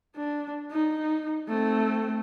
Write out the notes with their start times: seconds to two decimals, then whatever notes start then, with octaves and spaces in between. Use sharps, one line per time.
0.16 D4
0.71 D#4
1.48 A3 C4